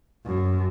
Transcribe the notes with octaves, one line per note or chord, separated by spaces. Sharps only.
F#2